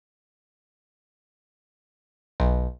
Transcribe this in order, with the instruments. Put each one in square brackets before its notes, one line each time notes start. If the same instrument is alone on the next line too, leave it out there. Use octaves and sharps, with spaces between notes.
[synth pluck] B1